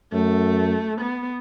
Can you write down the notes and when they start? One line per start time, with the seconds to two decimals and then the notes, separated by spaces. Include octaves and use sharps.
0.12 F#2 A3
1.01 B3